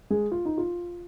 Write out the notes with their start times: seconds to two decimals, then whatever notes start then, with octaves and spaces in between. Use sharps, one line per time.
0.10 G#3 G#4
0.32 F4
0.45 D#4
0.58 F4